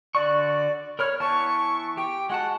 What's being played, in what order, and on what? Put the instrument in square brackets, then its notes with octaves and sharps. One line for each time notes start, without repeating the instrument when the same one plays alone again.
[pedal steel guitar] D3 F#4 C#6 [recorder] D5
[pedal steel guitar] A#4 B5 F6 [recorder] C#5
[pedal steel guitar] E3 B3 A5 [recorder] C#6
[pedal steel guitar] G4 [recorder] G5
[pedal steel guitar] G#3 F#4 A5 [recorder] F#5